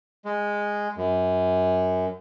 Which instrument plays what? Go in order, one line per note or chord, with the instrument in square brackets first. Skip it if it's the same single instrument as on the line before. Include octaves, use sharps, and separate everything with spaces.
[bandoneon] G#3
F#2